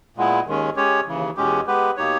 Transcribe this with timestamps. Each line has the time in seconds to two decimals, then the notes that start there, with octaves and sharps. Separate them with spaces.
0.17 A#2 G#3 B3 E4
0.46 D#2 D#3 G#3 C#4
0.76 G#3 C#4 G4 C#5
1.07 D#2 C#3 E3
1.37 E2 B2 G#3 C#4 G4
1.67 G#3 B3 G4 B4
1.97 B2 A#3 D#4 G4 C#5